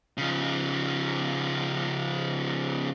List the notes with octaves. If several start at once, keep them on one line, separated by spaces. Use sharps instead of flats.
C#3 F3